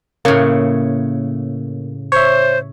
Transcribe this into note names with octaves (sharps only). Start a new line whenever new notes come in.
A2 C#3 A#3
C5 C#5 E5